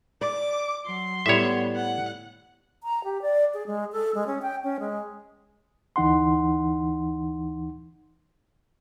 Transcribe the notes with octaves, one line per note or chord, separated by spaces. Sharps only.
D5 D6
F#3 C6
A2 G3 B3 C#5 E5
F#5
A#5
G4
D5
G#4
G#3
A4
G#3
C#4
G5
C#4
G#3
D2 E3 D#4 F#5 C6